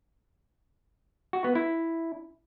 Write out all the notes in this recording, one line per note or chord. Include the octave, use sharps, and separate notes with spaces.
F#4
B3
E4